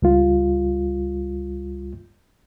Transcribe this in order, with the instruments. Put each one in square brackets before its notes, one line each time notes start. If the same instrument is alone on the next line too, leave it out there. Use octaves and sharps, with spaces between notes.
[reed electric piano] C#2 G3 F4